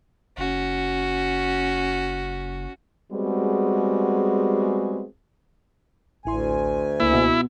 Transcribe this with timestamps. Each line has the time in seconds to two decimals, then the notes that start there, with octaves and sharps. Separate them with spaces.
0.37 F#1 C#4 F#4
3.12 G3 G#3 B3 C4 F#4 G#4
6.25 A1 D2 E4 G#5 C6
7.00 C#2 A#3 E4
7.13 B2